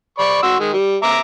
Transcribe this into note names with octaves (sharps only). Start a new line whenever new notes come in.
D5 B5 C#6
F#4 C6 E6
D#3 G#3
G3
E5 A#5 D6